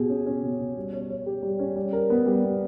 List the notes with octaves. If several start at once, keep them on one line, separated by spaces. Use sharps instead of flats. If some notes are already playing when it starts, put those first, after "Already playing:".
Already playing: B2 G4 G#4
C#4
C#4
B2
B2
G3
C#5
C#5
G4
G3
C#4
G3
A#4
B3
G3
B3